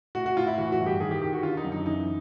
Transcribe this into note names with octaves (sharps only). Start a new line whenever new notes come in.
A2 F#4
F#4
A2 F4
E4
E3 F#4
F#4
G2
G4
D#3 G#4
G4
D#3 G4
F#4
D3 F4
D#4
F#2
D#4
E3 D#4